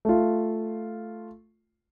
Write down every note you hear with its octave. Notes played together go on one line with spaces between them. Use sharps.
A3 F4